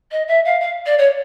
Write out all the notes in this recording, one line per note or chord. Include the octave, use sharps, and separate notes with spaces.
D#5
E5
F5
F5
D5
C#5